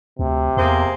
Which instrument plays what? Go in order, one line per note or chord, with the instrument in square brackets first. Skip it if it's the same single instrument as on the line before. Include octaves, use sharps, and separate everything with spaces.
[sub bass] D2 [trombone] C3
[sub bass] E2 [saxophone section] A#3 G#4 C5